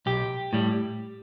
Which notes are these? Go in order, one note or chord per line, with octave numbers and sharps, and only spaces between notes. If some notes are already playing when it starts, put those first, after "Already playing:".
B1 G4
A2 G3